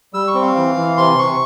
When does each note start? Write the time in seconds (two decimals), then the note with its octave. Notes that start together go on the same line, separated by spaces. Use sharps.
0.13 G3 E6
0.27 C#6
0.35 C4
0.42 F5
0.56 E3
0.77 E3
0.97 C3 C6
1.18 C3 C#6